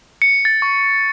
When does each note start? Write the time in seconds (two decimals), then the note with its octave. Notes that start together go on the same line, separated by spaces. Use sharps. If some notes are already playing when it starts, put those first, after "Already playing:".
0.22 C#7
0.45 A6
0.62 C#6